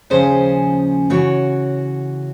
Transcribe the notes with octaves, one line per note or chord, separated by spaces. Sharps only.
D#2 C#3 F3 C#4 G#4 C5
C#3 E3 F#4 C#5